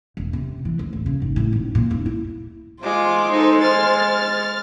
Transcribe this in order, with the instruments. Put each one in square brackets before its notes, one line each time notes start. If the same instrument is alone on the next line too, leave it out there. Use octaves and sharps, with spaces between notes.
[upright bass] E1
C3
E3
D2
D1
C#3
G#1
A2
D#1
A#2
D#1
E4
[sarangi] G#3 [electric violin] F4 D6 [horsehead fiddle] C5
[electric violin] D#4 A4
F6 A6